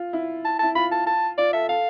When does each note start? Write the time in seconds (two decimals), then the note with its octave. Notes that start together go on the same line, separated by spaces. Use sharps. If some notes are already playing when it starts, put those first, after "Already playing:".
Already playing: F4
0.13 E4
0.45 A5
0.59 E4 A5
0.75 F4 B5
0.92 A5
1.07 A5
1.38 F4 D5
1.53 A4 E5
1.69 A4 F5